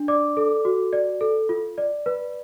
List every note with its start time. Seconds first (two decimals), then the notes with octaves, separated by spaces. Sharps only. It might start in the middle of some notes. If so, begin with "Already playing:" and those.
Already playing: D4
0.08 D5 D6
0.37 A4
0.65 F#4
0.93 D5
1.21 A4
1.49 F4
1.78 D5
2.06 B4